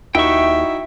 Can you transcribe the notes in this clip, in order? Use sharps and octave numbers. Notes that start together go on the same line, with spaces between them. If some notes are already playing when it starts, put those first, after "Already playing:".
D#2 D#4 E4 F#4 E5 G5 C#6